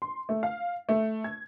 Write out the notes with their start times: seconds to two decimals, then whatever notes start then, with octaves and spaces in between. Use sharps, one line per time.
0.02 C6
0.29 A3
0.43 F5
0.89 A3
1.24 G#6